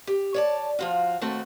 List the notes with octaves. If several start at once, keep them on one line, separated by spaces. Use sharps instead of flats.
G4
C#5 D5 A5
F3 F4 F#4
D#2 A3 C4 F#4 A4